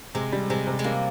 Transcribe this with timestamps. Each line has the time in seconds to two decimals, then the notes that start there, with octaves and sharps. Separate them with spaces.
0.15 C3 G#3
0.32 G3
0.50 C3 G#3
0.67 C3
0.79 G#3
0.84 G3 A#3